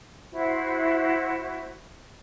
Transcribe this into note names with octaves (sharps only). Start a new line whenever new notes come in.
E4 F#4 C5